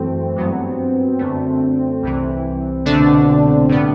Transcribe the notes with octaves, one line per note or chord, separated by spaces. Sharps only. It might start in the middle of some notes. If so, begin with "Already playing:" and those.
Already playing: F#2 E3 A3 C4
G2 F#3 B3
F#2 D3 A3
C2 C3 E3
C2 B2 D3 A3 D4
A2 G3 B3